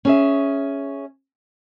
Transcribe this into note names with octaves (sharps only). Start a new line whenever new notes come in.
C#4 G#4 E5